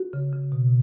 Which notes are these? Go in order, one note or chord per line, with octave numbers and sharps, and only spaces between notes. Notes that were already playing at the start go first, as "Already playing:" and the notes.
Already playing: F#4
C#3
C#3
B2